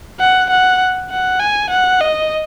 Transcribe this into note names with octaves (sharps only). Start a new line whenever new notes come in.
F#5
F#5
F#5
G#5
F#5
D#5